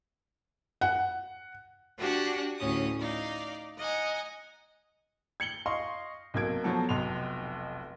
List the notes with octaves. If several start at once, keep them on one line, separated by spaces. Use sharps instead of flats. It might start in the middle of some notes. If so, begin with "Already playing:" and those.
F#5
D4 F#4 G4 F#5 G#5
D2 A2 C#4 D#6
D#4 D5 F5
D#5 F#5 G#5 A#5
G#6 C#7 F#7 G7
D#5 F5 C6 C#6
B1 C3 A#3 G#6 D7
B2 F3 F#3 A4
F1 B1 C6 F7